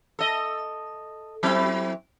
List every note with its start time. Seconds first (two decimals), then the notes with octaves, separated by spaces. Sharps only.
0.19 A4 D#5
1.43 F#3 C4 E4